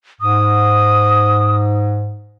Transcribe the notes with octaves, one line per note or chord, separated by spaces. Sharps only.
G#2 D#6